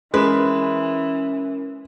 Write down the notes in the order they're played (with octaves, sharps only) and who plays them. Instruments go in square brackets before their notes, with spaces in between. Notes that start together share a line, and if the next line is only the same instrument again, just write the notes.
[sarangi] E3 [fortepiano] G#3 [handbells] C#4 A#4 [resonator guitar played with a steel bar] B4